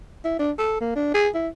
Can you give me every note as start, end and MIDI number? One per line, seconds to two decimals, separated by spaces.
0.25 0.36 64
0.39 0.52 62
0.59 0.78 69
0.81 0.94 58
0.96 1.13 62
1.14 1.29 68
1.35 1.48 64